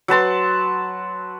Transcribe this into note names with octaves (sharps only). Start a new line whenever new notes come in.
F#3 B4 A5 C6